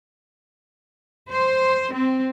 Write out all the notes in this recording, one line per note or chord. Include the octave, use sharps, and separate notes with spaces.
C5
C4